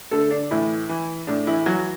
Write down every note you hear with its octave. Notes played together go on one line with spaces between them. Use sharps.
D3 A3 A4
D4
A2 E3 E4
E3
A2 D4
E3 E4
E3 F#3 F#4